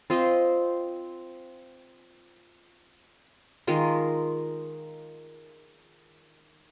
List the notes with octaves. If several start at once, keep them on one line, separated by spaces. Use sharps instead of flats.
C4 F4 C5 D#5
D#3 G#3 F4 A#4